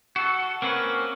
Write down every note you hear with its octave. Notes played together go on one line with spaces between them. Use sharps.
F#4 A4
A#3 C4 C#4 F#4 B4